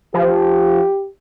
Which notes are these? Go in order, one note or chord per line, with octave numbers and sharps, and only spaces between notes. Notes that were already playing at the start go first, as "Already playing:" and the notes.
F3 G4